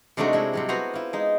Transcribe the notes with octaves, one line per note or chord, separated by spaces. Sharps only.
C3 G#3 A3 D4 D#4 F#4
G#3 E4
C3 F#3 G3
B3 E4 F#4 C5 A#5
E4 F4
G#3 D#4